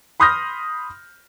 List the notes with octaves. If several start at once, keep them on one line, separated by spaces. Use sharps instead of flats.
B5 C6 D#6 F6 G6 A#6